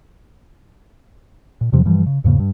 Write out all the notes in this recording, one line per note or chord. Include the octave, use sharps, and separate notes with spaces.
A#2
E2 C3 F3 F#3
G2 E3 F3 G3
C#3
E2 G#2 C#3 A#3
G2